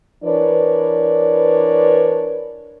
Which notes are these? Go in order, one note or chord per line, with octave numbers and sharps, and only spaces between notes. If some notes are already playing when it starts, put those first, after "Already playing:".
E3 D4 A#4 B4 C#5 D5